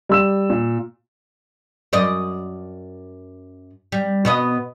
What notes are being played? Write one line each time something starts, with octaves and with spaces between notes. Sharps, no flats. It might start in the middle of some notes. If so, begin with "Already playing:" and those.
G3 E6 E7
A#2
F#2 D5 D#5
G3
B2 B3 D#5